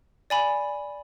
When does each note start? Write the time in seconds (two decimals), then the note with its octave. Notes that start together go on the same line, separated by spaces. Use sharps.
0.30 D5 G#5 B5